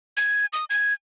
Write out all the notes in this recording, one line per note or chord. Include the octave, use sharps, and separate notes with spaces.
G#6
D#6
G#6